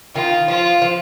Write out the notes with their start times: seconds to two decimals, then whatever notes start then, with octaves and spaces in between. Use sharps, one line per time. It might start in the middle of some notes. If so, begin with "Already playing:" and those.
0.15 D#3 F4
0.48 F3 F4
0.82 F3